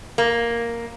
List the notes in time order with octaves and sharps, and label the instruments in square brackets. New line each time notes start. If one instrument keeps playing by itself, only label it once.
[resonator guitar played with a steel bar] A#3